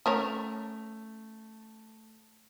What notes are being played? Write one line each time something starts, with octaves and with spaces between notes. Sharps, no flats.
A3 C#4 A#4 C#5 A5 F7